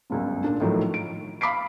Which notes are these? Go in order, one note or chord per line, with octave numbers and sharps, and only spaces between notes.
G1 C#2 F#2
A#2 D4
A2 D#3 F3 F#3 A3
D7
F5 B5 D6 B6 C7 D7